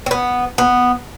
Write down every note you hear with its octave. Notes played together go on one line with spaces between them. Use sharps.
C4
B3
B3